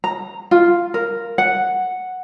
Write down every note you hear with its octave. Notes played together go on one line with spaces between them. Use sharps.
A#5
F4
A#4
F#5